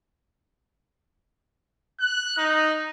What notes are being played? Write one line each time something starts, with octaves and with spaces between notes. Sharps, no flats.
F#6
D#4